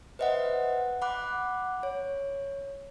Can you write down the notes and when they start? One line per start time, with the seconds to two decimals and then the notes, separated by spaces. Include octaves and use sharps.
0.19 B4 C5 D#5 E5 F#5
1.02 F#5 B5 D6 F#6
1.83 C#5